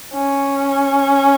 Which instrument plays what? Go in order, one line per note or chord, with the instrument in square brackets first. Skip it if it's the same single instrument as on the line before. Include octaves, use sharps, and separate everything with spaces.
[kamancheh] C#4